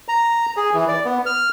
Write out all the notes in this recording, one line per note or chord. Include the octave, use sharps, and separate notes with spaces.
A#5
G#4
E3
D5
B3
F6